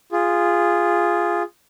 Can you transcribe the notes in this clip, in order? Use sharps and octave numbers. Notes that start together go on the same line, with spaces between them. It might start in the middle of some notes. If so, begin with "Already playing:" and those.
F4 G#4